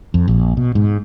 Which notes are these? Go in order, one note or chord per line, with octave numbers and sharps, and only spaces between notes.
F2
A#1
B2
G#2